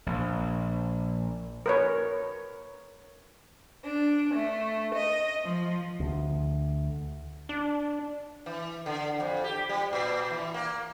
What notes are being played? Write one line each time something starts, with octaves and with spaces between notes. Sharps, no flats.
A#1
A#4 B4 C#5
D4
A3
D#5
F3
D2
D4
E3
D3
F2
G4
G3
A#2
E3
A#3